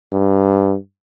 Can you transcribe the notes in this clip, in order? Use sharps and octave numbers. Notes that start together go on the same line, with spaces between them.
G2